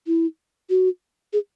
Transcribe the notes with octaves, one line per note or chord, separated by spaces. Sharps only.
E4
F#4
G#4